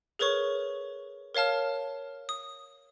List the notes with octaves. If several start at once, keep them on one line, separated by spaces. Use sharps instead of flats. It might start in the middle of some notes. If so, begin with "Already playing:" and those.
G#4 A#4 B4 C#5 C#6
A#4 C#5 F5 A5 F6
D#6